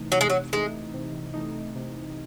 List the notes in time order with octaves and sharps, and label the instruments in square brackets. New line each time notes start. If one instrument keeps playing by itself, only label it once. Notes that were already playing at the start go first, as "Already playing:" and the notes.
Already playing: [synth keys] C3 E3 A3 D#4
[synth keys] C3 [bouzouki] F#3
[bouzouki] G#3
F#3
[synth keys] E3 A3 D#4 [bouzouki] G#3
[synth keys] C3
E3 A3 D#4
C3